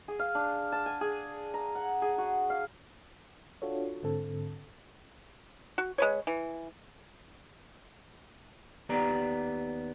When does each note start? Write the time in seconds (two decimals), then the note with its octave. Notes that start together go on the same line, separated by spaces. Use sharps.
0.08 G#4
0.19 F5
0.35 D4
0.72 A5
0.86 G#5
1.01 G#4
1.54 A#5
1.75 F#5
2.02 G#4
2.18 F#4
2.50 F5
3.62 D4 F4 F#4 A4 C#5
4.03 G#2 D3 C4 A4
5.78 F#4
5.98 G#3 B4 C#5
6.27 E3
8.89 D#2 B3 G4 D5 A#5